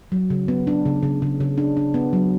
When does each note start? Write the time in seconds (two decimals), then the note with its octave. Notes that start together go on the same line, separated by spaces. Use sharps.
0.12 F#3
0.30 C#3
0.48 B3
0.67 D4
0.85 C#3
1.03 C#3
1.22 C#3
1.40 C#3
1.58 D4
1.77 D4
1.94 B3
2.13 F#3